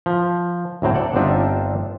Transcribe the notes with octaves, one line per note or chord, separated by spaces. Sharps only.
F3
D2 A2 F#3 C4
A4 D5 F#5
G1 C4 D4 D#4 F4 E5